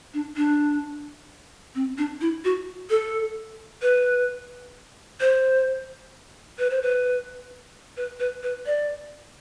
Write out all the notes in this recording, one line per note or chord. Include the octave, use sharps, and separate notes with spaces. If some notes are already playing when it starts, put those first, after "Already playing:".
D4
D4
C4
D4
E4
F#4
A4
B4
C5
B4
C5
B4
B4
B4
B4
D5